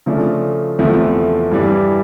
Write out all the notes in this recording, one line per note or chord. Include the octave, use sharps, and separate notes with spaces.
C#3 F3 A3 D4
E2 C3 F3 A3
G2 E3 G3